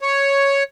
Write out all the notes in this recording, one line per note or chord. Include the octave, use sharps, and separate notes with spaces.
C#5